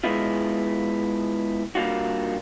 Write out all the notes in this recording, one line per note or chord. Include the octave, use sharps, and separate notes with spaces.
G#3 B3 E4 F4
G3 A#3 D4 F4 F#4